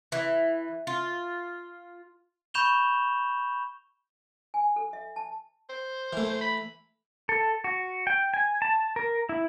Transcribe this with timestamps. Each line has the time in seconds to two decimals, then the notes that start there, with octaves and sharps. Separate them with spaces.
0.12 E3
0.87 F4
2.54 B5 C#6 G6 E7 F7 G7
4.54 G#5
4.76 A4
4.93 E5
5.16 A5
5.69 C5
6.13 E3 A3
6.41 B5
7.29 A4
7.64 F#4
8.07 G5
8.34 G#5
8.62 A5
8.96 A#4
9.29 E4